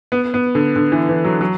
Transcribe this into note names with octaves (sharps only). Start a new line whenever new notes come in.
B3
B3
D3
D3
E3
E3
F#3
F#3